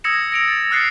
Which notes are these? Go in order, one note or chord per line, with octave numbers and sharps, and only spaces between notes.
D#6 E6 G#6 A#6 C#7 E7
A#6 D7 F7
A6
D#6 F6 F#6 A6 C7 C#7